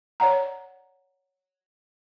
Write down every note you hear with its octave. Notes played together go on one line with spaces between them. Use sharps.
C#5 D5 F#5 A#5